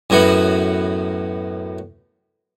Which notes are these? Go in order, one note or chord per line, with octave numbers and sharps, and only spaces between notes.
F#2 A2 B3 F#4